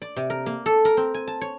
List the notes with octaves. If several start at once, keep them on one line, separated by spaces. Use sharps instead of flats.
D5
C3
A#4
A#3
A4
A#4
C4
G#5
A5
C#5